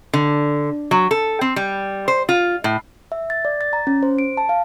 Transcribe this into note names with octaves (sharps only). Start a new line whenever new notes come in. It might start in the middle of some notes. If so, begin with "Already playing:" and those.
D3
F#3
A4
C4
G3
C5
F4
A2
E5
A6
D5
A6
A#5
C#4
C5
D7
A5
F5